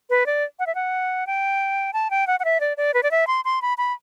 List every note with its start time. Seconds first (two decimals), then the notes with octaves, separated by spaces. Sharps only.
0.10 B4
0.26 D5
0.59 F#5
0.67 E5
0.75 F#5
1.27 G5
1.93 A5
2.10 G5
2.27 F#5
2.40 F#5
2.45 E5
2.60 D5
2.77 D5
2.94 B4
3.03 D5
3.11 E5
3.27 C6
3.45 C6
3.62 B5
3.78 B5